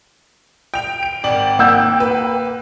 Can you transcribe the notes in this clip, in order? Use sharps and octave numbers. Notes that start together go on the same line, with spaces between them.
G5 F7
D7
G#1 D5 G5 F#7
A#3 F#5 E6 G6
B4